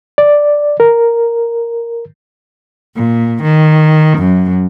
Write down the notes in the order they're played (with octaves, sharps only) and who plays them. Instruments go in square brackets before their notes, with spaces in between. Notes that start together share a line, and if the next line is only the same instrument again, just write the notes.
[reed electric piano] D5
A#4
[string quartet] A#2
D#3
F#2